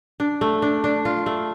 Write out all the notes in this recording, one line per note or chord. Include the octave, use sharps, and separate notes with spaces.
D4
A3
D4
D4
F4
A3